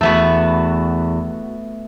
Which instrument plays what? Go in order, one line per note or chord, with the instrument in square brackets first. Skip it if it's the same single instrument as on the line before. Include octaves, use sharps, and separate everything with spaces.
[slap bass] E2 [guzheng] A3 B3 F#4